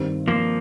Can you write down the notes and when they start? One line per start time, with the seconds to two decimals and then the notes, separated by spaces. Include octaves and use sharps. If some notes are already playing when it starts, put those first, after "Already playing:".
Already playing: G2 D#3 G3 C4
0.28 F3 A#3